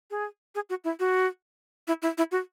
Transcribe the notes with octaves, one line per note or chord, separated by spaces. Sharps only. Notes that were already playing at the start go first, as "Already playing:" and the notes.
G#4
G#4
F#4
E4
F#4
E4
E4
E4
F#4